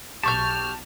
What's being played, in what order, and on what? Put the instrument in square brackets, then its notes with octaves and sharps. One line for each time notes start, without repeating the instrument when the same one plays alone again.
[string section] B1 F6 [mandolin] G4 C#6 G6 [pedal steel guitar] A5